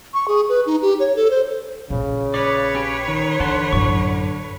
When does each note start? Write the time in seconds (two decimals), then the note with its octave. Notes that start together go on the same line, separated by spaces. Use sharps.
0.14 C#6
0.28 G#4
0.49 B4
0.66 D#4
0.82 G4
1.00 C#5
1.16 A4
1.30 C5
1.90 A#1 A#2 C#3
2.34 B4 C#5 D5
2.75 C#4 G4
3.08 D#3
3.40 D3 E3 F#5 A5 C6
3.73 A1 F#2 C#6